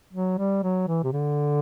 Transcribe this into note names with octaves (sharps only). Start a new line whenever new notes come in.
F#3
G3
F#3
E3
C3
D3